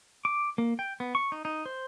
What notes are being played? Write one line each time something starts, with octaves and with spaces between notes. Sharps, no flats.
D6
A#3
G5
B3
C#6
D#4
D#4
C5